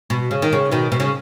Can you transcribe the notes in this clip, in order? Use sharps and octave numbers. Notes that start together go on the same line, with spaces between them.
B2
C#3
D#3
C#3
B2 D#3
B2
C#3